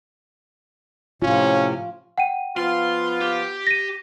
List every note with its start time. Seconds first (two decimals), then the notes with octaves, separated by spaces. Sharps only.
1.22 A2 C3 C#4 F4
2.18 F#5 G5 D#7
2.57 F3 B3 F4 C6
3.21 G4
3.67 A#6 D#7